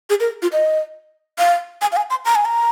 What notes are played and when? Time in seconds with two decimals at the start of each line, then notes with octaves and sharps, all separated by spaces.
0.10 G#4
0.20 A#4
0.42 F4
0.52 D#5
1.39 F5
1.81 G#5
1.92 F5
1.97 G#5
2.10 C6
2.25 A#5
2.35 G#5
2.45 A#5